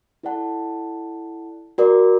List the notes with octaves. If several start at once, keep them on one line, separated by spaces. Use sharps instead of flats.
E4 A4 D5 F#5 A5
F#4 A#4 D5